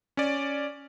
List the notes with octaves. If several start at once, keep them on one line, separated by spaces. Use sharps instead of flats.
C#4 D5